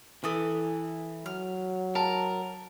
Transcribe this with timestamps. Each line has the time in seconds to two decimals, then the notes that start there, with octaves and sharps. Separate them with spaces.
0.24 E3 A4 D6 D#6
1.26 F#3 F6
1.95 A#4 A5